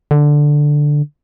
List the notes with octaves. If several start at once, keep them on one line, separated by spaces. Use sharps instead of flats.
D3